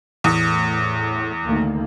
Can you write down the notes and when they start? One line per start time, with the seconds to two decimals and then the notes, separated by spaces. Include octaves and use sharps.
0.24 E2 A2
1.45 D2 D#3 A#3